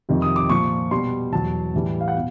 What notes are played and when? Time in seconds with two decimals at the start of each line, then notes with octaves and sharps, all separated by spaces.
0.09 F2 C3 D#3 G3
0.22 D#6
0.36 D6
0.50 A#2 F3 C#6
0.91 B2 G3 C6
1.32 E2 B2 F#3 A5
1.74 A2 E3 G3
2.01 F5
2.08 F#5
2.15 B2